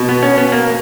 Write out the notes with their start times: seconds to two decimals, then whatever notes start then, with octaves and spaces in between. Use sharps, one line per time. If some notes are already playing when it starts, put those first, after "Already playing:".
Already playing: B2
0.09 B3
0.23 C#4
0.38 B3
0.52 A#3